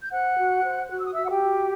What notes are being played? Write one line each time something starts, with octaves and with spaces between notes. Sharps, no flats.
G6
C5 F#5 F#6
F#4
C5
F#4 F#6
E6
D#6
F#4 E5 E6
F#5
G4 G5
F#4